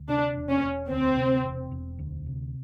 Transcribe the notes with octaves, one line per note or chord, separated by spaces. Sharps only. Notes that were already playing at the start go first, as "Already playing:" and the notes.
Already playing: D2
C3 D4
E1
C#4
E1
D2 C4
C3
E1
E1
D2
C3